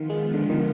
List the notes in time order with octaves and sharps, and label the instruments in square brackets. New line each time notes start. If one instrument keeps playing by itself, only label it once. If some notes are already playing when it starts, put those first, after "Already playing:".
Already playing: [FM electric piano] D#3 [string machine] F3 B3 F4
[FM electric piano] G#3
D3
D#3